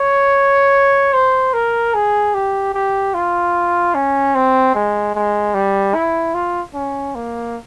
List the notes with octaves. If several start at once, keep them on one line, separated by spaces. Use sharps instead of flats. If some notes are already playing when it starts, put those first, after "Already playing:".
Already playing: C#5
C5
A#4
G#4
G4
G4
F4
C#4
C4
G#3
G#3
G3
E4
F4
C#4
A#3